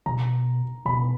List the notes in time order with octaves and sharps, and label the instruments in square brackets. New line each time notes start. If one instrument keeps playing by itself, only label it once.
[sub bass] B2 [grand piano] A#5
[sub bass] B2 [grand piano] B5